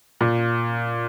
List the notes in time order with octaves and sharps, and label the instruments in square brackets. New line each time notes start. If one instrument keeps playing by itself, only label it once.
[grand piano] A#2